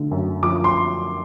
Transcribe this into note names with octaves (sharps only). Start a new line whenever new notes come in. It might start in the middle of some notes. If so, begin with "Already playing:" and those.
Already playing: D3 A3
F#2
F3 D6
C6